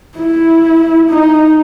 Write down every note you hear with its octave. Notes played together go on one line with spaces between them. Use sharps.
E4
D#4